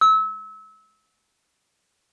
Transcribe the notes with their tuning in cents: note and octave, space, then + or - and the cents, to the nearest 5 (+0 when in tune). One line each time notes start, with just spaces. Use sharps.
E6 -30